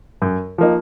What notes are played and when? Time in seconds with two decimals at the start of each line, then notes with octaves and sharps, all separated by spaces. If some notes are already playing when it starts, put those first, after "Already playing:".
0.22 F#2
0.58 F3 A#3 D#4